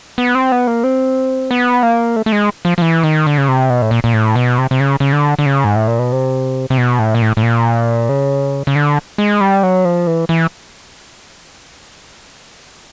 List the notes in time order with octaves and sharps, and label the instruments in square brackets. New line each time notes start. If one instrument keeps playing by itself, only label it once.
[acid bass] B3
C4
B3
A#3
C4
B3
A#3
A3
A3
G#3
F3
F3
E3
D#3
D3
C#3
C3
B2
A2
A#2
A#2
A2
B2
C3
C3
C#3
C#3
D3
D3
C#3
G#2
A2
A#2
B2
C3
C3
B2
A2
A#2
A2
A2
A#2
C#3
C#3
D3
G#3
G3
F#3
F3
E3
E3